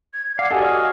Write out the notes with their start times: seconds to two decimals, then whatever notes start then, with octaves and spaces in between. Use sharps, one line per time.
0.14 G#6
0.39 D5 F5 F#5
0.51 F#4 G4 A4 D5 D#5 G#5
0.62 C#5 D#5 F6